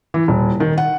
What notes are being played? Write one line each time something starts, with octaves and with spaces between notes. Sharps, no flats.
E3
D#1
D#3
F#5